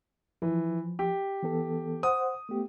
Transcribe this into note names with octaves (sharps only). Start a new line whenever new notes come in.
E3 F3
G4
E3 B3 A4
C5 F#5 D#6
A3 B3 G4